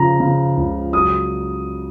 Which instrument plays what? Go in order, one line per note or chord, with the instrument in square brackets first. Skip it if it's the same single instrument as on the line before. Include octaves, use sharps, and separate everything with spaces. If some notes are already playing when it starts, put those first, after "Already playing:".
Already playing: [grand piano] C#3 F3 A#5
C#3
C#2
F#3 D#6